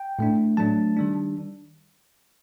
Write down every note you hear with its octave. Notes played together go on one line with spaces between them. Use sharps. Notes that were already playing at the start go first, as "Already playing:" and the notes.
Already playing: G5
A2 A3 D4
F#3 A3 D4 A5
D#3 G3 D4